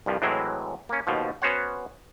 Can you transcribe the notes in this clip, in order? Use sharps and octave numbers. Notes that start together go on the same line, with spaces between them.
C2 G2 F3
A2 E3 F#3 G#3 C4 E4
A#3 C#4
D#2 B2 F3
B3 C#4 F#4 C5 C#5 F#5